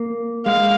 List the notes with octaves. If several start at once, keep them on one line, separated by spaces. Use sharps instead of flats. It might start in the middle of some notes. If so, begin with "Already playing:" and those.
Already playing: A#3
G#3 F5